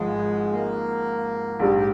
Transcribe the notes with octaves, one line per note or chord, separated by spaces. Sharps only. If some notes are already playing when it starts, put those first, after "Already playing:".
Already playing: G#1 G#2 F3 G#3
A#3
A#1 G#2 G3 G4
G4